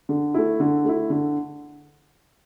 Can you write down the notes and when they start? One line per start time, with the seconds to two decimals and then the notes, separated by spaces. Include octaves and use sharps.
0.09 D3
0.34 A3 E4
0.60 D3
0.85 A3 E4
1.10 D3